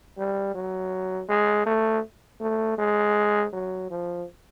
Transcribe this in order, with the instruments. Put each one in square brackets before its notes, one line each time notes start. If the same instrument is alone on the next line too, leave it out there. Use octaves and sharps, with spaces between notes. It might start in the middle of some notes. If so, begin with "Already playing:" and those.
[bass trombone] G3
F#3
G#3
A3
A3
G#3
F#3
F3